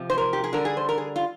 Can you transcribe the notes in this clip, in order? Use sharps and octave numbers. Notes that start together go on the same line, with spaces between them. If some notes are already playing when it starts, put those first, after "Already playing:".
Already playing: C3 F3
C5
A#4
G4
G#4
D3 G3 A#4
G#4
C5
A#4
G#4
F4